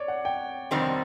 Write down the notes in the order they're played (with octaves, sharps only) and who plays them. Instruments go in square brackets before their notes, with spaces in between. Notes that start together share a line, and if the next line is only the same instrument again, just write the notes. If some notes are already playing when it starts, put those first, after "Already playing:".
Already playing: [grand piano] C#5 D5
F#5
G5
[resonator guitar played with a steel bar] F2 C3 D#3 G3 C4